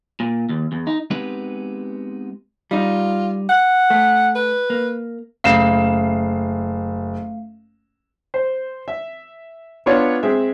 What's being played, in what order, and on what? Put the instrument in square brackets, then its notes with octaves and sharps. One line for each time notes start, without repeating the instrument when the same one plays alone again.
[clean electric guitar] A#2
D#2
E2
D#4
G#3 B3 C4 D#4 G4 B4
[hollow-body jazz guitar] G3 D#4 [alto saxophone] F4
[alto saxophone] F#5
[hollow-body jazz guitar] A3
[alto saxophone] B4
[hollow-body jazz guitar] A#3
[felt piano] F#1 C7 E7 [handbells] A3 F5
[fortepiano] C5
E5
B3 D4 F4 C#5
G#3 C4 E5